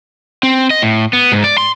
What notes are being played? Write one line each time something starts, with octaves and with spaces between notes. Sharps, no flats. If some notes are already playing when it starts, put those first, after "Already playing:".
C4
D#5
A2
B3
G#2
D5
C6